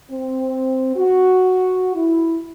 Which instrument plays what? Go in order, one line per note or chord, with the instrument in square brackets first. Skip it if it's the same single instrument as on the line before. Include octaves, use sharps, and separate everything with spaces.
[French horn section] C4
F#4
E4